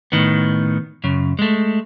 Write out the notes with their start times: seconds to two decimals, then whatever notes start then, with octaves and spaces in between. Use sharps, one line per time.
0.12 A2 D#3 B3
1.04 F#2 C#3
1.39 G#3 A3